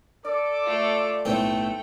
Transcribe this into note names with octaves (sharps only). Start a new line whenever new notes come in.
A4 D5 D6
A3 F4
B1 A2 A3 C4 G5